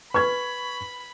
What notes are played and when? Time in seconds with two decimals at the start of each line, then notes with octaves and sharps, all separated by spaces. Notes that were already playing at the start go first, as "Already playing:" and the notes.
0.14 B4 B5 C#6 G#6